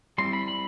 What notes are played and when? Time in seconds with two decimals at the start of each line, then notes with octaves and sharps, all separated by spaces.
0.18 G3 C4 E4 C6
0.33 B5
0.48 B5